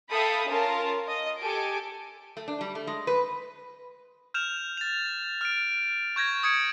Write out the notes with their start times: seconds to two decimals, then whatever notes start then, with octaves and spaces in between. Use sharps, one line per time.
0.11 A4 E5 F5 G5 B5 D#6
0.47 C#4 F4 A#4 A5
1.08 D#5
1.39 G4 A4 G#5 D7
2.37 A3
2.48 D4
2.61 G3
2.75 A3
2.87 G#3
3.07 B4
4.34 F6 G6 E7 F7
4.77 A6 F7
5.41 F6 D7
6.16 C#6 G6 G#6 A#6
6.43 D#6 G#6 C#7 D7